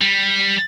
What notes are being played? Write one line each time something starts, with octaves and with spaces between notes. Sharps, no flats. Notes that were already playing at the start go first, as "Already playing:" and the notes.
G3